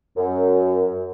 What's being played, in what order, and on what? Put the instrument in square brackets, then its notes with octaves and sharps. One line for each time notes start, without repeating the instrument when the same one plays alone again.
[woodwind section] F#2